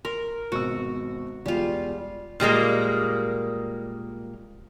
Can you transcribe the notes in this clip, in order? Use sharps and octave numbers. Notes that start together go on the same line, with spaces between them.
A#4 C6
G#1 B2 F#4 E6
E2 G3 G#3 F4
A#2 G3 G#3 A#3